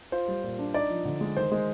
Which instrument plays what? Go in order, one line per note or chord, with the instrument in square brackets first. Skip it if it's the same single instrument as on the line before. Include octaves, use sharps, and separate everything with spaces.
[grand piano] F4 C5
G3
A#2
D4
D#4 D5
F3
D3
G#3
D#3 C5
G#3